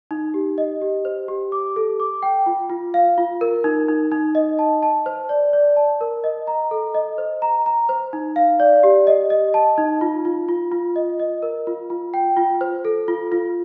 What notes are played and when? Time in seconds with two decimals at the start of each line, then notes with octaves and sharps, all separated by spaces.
0.11 D#4
0.34 G4
0.58 D#5
0.81 G4
1.05 C5
1.28 G4
1.52 D6
1.76 A4
2.00 D6
2.23 G5
2.46 F4
2.70 F4
2.94 F5
3.18 F4
3.41 A#4
3.64 D#4
3.88 D#4
4.12 D#4
4.35 D#5
4.59 A5
4.83 A5
5.06 C5
5.29 D5
5.53 D5
5.77 A5
6.01 A#4
6.24 D#5
6.47 A#5
6.71 A4
6.95 D#5
7.18 C5
7.42 A#5
7.66 A#5
7.89 C5
8.13 D#4
8.36 F5
8.60 D5
8.83 G4
9.07 D#5
9.30 D#5
9.54 A5
9.78 D#4
10.01 F4
10.25 F4
10.48 F4
10.72 F4
10.96 D#5
11.19 D#5
11.43 A#4
11.67 F4
11.90 F4
12.14 G5
12.37 F4
12.61 C5
12.85 A4
13.08 F4
13.32 F4